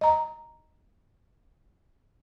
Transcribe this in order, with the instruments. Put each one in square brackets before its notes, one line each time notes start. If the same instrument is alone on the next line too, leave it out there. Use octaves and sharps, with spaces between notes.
[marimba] D#5 A#5